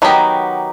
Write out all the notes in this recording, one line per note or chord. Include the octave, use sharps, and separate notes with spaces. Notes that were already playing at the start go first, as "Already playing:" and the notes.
D#3 F#3 B3 D#4 G4